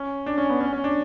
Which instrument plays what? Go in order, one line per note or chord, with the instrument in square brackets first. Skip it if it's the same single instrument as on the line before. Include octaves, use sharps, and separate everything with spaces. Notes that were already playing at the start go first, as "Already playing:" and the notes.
Already playing: [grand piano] C#4
D4
C#4
B3
C#4
C#4
D4